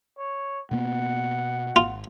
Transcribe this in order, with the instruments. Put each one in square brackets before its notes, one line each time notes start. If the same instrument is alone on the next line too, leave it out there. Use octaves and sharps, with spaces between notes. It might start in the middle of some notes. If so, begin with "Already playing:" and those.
[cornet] C#5
[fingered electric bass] B2 A#3 B3 [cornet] F#5
[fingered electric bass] G#1 [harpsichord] F4